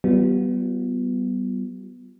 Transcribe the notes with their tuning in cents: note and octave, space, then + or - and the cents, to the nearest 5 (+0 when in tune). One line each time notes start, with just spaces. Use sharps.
G3 -35 B3 +0 F4 +0